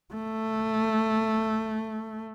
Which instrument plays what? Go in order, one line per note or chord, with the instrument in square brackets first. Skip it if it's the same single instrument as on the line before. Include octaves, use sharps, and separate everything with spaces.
[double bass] A3